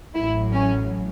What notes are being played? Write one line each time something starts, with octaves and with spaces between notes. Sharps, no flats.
A1 A2 F#3 E4
C#4